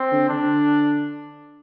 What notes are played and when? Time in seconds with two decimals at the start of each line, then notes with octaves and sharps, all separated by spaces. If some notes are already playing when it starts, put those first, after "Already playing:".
Already playing: C4
0.11 D3
0.29 D3 D4